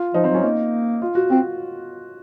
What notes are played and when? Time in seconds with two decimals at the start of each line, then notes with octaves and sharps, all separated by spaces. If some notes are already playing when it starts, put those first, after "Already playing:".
Already playing: F4
0.14 F3 D#4
0.24 C4
0.29 F#3
0.35 C#4
0.43 A#3 D#4
1.02 F4
1.15 F#4
1.30 C4 F#4